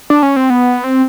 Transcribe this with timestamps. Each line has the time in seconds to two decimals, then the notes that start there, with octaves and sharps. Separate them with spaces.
0.10 D4
0.23 C#4
0.36 C4
0.50 B3
0.84 C4